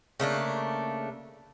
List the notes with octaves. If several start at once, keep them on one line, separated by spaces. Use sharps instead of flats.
C#3 A3 A#3 D4